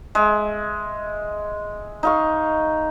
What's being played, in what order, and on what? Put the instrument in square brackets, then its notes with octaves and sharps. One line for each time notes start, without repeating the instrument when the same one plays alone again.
[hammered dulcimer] G#3 E5
D#4 F5 C#6